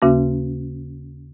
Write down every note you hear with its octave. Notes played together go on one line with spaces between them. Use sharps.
D#2 C#3 A#3 C#4 F#4